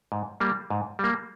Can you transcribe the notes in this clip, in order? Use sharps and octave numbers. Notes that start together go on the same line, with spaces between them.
G#2
G3 A#3
G#2
G3 A#3